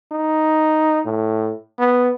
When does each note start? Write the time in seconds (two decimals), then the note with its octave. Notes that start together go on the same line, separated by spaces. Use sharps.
0.12 D#4
1.05 A2
1.79 B3